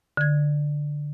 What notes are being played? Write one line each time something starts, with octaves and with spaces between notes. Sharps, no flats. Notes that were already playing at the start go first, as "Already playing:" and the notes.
D3 G#6